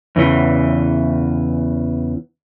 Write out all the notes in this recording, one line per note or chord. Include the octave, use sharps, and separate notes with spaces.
E2 C#3 E3